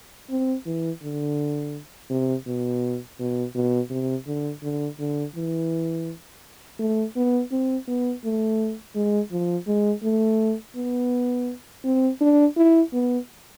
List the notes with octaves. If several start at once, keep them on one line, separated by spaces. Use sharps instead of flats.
C4
E3
D3
C3
B2
B2
B2
C3
D3
D3
D3
E3
A3
B3
C4
B3
A3
G#3
F3
G#3
A3
B3
C4
D4
E4
B3